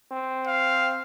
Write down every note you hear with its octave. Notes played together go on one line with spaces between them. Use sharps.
C4
F5